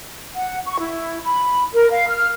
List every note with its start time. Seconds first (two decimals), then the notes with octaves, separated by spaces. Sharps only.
0.35 F#5
0.66 C#6
0.79 E4
1.25 B5
1.74 A#4
1.91 F5
2.08 F6